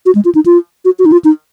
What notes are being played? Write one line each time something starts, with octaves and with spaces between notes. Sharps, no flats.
F#4
G#3
F4
D#4
F4
F#4
F#4
D#4
F4
D#4